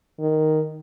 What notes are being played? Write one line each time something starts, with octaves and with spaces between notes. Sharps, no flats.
D#3